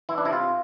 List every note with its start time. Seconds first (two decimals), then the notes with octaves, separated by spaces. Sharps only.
0.09 E3 E4
0.18 D4
0.25 C3 E4
0.33 F4